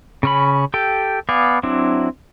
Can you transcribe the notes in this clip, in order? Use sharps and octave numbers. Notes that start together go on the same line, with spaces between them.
C#3 C#4 B5
G4 A4 G5
B3 D5 F5 G#5
F#3 C4 D4 E4